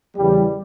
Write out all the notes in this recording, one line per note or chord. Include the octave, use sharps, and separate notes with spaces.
E2 C#3 E3 G3